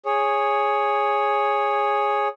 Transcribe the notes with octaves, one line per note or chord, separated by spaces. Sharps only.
G#4 C#5